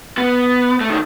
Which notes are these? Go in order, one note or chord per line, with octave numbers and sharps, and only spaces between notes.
B3
A3
D#3